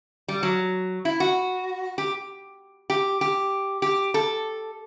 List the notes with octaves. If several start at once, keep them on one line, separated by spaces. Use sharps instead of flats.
G3
F#3
E4
F#4
G4
G4
G4
G4
A4